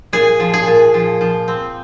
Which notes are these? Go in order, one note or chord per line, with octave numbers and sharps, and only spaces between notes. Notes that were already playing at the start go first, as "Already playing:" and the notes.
A#2 G#4
F3
G#4
A#2
F3
F3
C4